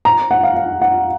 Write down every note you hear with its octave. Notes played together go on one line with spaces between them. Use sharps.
A#5
F#5
F5
F5
F#5